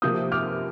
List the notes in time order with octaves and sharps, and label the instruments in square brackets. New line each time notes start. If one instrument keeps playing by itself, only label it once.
[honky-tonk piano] C3 F3 A#3 [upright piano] D#6 G6
[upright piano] D6 F6